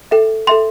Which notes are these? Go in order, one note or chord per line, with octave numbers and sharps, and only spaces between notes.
A4 E5 G5
A4 E5 G5 C6